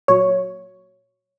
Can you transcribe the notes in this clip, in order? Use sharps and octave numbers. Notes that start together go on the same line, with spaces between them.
A#2 F#3 C#5